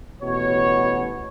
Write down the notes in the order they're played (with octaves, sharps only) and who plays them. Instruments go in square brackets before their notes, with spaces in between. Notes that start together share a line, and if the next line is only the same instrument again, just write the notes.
[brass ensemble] A1 B2 C#5